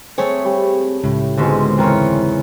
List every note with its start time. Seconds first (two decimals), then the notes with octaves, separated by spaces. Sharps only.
0.18 A3 C4 G#4 C#5
0.45 G3
1.04 C#2 A2
1.37 G#2 B2 D3 G#3 C4 C#4
1.78 E2 C#3 C4 A#4 C#5